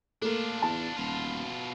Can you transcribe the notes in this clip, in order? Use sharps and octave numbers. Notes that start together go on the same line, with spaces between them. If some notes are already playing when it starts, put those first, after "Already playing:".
A3 A#3 D4 F4
E2 A5
D#1 B2 F4